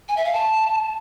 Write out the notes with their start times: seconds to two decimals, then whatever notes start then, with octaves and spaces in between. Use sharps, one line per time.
0.09 G#5
0.17 E5
0.25 F5
0.33 A5